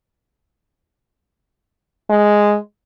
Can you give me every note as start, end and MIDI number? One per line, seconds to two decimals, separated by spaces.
2.10 2.56 56